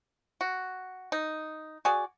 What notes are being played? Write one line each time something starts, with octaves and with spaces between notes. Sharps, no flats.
F#4
D#4
F#4 G#4 D5